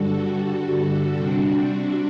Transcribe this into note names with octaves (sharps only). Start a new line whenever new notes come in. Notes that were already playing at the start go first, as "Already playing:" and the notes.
Already playing: G2 D3 G3 F#4 A4
C3 G3 C4 D4 F#4